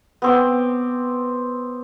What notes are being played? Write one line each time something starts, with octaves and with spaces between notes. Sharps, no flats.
B3 C4 D6